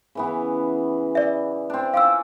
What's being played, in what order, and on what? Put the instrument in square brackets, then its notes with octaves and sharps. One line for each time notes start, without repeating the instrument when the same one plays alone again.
[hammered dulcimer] C#3 E3 B3
[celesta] D5 E5
[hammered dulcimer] C4 D4
[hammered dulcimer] C#4 F4 D5 [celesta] F5 E6